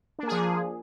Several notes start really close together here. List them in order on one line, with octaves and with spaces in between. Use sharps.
D4 A#3 G#4 F3